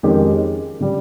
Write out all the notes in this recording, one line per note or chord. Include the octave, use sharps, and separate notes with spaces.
F2 D#3 G#3 C#4 G4
C#3 G3